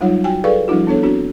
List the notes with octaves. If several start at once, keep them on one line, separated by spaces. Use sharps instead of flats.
F#3 G3 D#4 F4 C#5 F#5
F#4 G5 G#5
G#4 A4 B4 D5 F5 C#6
F3 G3 D4 E4 F#4
B3 D4 A4 C#5
C4 D4 F#4